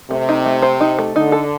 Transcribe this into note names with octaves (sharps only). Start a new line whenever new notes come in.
C3 A3
D#4
A3
C5
D#4
A3
D3 D#4
A4